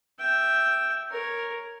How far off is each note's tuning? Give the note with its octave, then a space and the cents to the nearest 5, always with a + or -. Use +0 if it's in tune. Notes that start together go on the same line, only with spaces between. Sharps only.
E5 +0 G5 +0
A#4 +0 C#5 -5